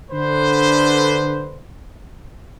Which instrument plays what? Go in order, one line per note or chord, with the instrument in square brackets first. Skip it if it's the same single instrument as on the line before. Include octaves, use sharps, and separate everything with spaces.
[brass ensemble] D3 B4 C5